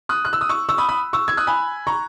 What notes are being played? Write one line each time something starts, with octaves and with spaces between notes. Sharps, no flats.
D#6 F#6
F#6
E6
D#6
C#6 E6
C#6 E6
B5 D#6
B5 D#6
C#6 E6
E6 G#6
D#6 F#6
G#5 B5
A#5 C#6